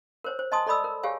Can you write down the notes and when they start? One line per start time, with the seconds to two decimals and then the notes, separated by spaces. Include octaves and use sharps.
0.24 A#4 C5 C#5
0.39 C5
0.52 D#5 G#5 A5 C6 D#6
0.67 A4 D5 D#5 B5 D#6 E6
0.84 A#4
1.03 G4 G#4 C#5 F5 G#5